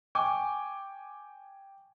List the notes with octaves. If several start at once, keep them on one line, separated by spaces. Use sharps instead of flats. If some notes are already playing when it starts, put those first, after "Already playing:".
G5 G#5 C#6 D6